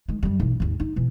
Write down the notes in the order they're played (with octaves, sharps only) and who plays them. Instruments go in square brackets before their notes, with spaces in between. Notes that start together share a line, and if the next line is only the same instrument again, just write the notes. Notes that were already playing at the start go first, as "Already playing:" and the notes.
[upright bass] D#3 G#3
F#2 G3
B1 E3
G#1 D#2
D#4
B2 E3